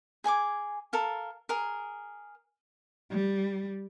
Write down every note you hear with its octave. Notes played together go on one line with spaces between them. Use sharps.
G#4 G#5 C#6 D6
A4 A#4 F5
G#4 A#4
G3